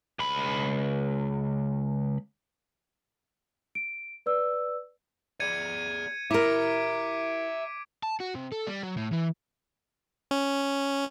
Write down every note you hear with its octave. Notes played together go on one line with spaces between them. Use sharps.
C#2 B5
D7
B4 D5 E6
G#4 D5 G#6 C#7 D#7
E4 A#4 E5 A#5 D6 B6 D7
A5
F#4
C3
A4
G3
F#3
A2
E3
C#4